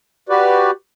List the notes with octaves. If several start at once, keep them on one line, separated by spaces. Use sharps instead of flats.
F#4 G4 B4 D5